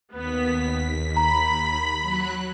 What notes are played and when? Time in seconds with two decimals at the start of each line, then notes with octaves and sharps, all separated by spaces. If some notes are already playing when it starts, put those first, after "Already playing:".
0.12 D#2 B3 B6
1.17 A#5 B5
2.00 F#3 F#6